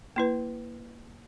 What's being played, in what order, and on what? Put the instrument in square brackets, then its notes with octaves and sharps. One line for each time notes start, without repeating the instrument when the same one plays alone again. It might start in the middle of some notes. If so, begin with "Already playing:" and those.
[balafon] A#3 E4 B4